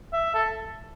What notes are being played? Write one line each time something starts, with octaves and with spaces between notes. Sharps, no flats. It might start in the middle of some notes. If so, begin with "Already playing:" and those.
E5
A4